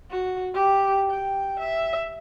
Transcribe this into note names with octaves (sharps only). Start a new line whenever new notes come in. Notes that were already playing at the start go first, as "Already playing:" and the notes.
F#4
G4
G5
E5